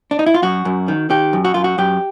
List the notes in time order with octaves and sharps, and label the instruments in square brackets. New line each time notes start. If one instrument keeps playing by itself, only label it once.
[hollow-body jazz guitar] D4
D#4
E4
F4
F#2 F#4
F#2
D#3
D#3 G4
F#2
F#4
F#2 F4
F#4
F#2 G4